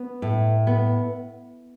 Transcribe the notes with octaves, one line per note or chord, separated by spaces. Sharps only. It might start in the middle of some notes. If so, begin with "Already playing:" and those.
Already playing: B3
A2
B3